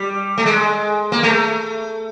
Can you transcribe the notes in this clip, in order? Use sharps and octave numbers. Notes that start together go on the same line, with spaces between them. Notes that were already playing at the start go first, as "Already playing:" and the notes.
Already playing: G3
A3
G#3
A#3
A3